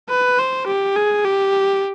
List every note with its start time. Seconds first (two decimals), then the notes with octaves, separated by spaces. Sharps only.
0.09 B4
0.39 C5
0.67 G4
0.96 G#4
1.25 G4